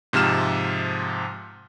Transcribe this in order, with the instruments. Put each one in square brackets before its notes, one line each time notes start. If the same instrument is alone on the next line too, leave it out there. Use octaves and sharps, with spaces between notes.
[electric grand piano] G#2 C3 F3 F6 E7